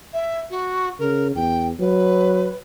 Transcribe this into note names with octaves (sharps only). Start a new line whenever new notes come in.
E5
F#4
C#3 A#4
E2 G5
F#3 B4